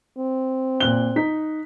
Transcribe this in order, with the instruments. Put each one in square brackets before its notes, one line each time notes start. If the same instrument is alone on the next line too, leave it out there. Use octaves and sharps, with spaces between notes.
[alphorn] C4
[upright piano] A#2 F#6 G7
D#4 B6